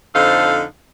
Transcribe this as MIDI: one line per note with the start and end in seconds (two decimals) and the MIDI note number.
0.15 0.63 41
0.15 0.63 50
0.15 0.63 63
0.15 0.63 69
0.15 0.63 72
0.15 0.63 77